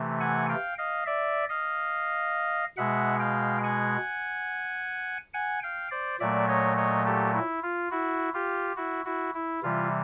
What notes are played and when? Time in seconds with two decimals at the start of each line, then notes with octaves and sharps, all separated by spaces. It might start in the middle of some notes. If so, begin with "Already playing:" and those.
Already playing: C3 E3 A3
0.20 F#5 G#5
0.49 F5 G5
0.78 D#5 F5
1.06 D5 E5
1.49 D#5 F5
2.77 B2 G#3 E5 F#5
3.20 F5 G5
3.64 F#5 G#5
5.34 F#5 G#5
5.62 F5 G5
5.91 C5 D5
6.20 A#2 F#3 A3 D5 E5
6.48 C#5 D#5
6.77 C#5 D#5
7.05 G4 A4
7.34 E4
7.63 F4
7.91 E4 F#4
8.34 F4 G4
8.76 E4 F#4
9.05 E4 F#4
9.35 E4
9.63 C3 E3 G3 F4